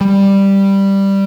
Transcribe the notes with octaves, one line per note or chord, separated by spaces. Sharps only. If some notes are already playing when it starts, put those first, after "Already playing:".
G3